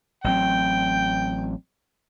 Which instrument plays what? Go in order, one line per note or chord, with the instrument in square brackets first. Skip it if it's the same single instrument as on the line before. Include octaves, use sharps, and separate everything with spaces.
[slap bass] A1 F#3 C4 [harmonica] G5